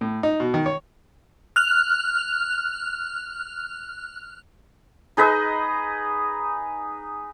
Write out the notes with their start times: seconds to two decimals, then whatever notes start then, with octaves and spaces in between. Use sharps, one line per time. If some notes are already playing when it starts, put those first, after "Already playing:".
0.01 A2
0.23 D#4
0.40 B2
0.54 D#3
0.66 C#5
1.56 F6 F#6 F7
5.17 D#4 G#4 B4 D#5